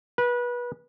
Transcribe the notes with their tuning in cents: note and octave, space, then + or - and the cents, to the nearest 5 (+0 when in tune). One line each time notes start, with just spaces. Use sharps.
B4 -25